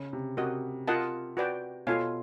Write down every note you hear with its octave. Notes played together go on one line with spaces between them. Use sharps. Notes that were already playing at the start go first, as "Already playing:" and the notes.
Already playing: C#3
C3
C3 F#4 A#4 D#5
F4 A#4 D#5 F#5 A5
F#4 B4 D5 G5
B2 F4 A4 C#5 F5 G#5